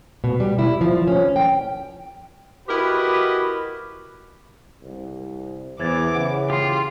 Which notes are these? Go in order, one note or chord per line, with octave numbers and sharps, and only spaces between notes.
B2
G3
E4
F3
C#4
G5
E4 F#4 G4 A#4 B4 D#5
C2
E2 E3 C5 D6 G#6 A6
C#3 F#5
F4 G4 C6